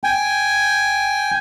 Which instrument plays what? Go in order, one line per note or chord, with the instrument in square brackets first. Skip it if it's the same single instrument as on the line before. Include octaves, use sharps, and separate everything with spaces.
[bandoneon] G5 G#5